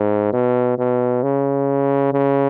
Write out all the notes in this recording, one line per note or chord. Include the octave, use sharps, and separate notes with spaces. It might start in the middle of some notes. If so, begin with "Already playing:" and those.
Already playing: G#2
B2
B2
C#3
C#3